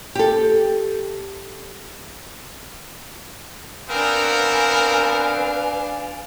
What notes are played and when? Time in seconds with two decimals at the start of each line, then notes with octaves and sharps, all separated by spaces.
0.15 G4 A4
3.89 B3 C4 D4 A#4 B4 F5 G#5